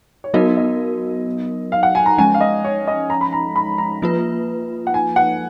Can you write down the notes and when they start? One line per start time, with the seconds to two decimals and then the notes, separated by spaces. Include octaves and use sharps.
0.24 C#5
0.34 F#3 B3 D#4 F#4 A#4 D#5
0.57 D#5
1.72 F5
1.83 F#5
1.95 G#5
2.06 A#5
2.18 F3 G#3 C#4 G#5
2.34 F5
2.41 D#5
2.65 C#5
2.88 D#5
3.10 A#5
3.21 B5
3.33 A#5
3.56 B5
3.78 A#5
4.02 F3 A#3 F4 B4
4.87 F#5
4.94 G#5
5.16 F#5